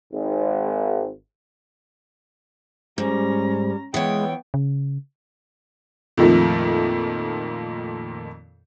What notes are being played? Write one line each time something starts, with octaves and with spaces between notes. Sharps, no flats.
G#1
G#2 G3 C#4 A#5
E3 G#3 B3 C#5 G5
C#3
F2 A#2 D#3 F3 A3